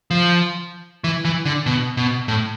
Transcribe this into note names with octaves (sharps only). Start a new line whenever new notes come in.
F3
E3
E3
D3
B2
B2
A2